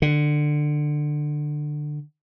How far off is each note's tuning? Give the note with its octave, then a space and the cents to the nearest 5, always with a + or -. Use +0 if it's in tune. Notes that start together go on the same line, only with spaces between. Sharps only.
D3 +20